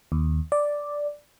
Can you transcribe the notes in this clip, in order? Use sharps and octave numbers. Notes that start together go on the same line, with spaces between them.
D#2
D5